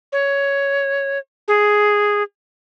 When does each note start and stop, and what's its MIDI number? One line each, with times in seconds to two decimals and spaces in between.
0.13 1.18 73
1.48 2.23 68